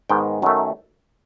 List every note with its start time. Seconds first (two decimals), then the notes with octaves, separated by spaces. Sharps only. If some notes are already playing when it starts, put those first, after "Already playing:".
0.09 G#2 D#3 G#3 B3 G5
0.42 F#2 D#3 F#3 A3